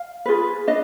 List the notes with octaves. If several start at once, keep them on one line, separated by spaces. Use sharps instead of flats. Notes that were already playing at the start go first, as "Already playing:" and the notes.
Already playing: F5
F4 G#4 B4
D4 D#5